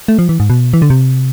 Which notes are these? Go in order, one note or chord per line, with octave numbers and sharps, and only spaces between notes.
A3
F3
E3
G#2
B2
E3
D3
C3